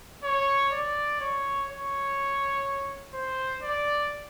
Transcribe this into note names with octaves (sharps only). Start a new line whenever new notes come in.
C#5
D5
C#5
C#5
C5
D5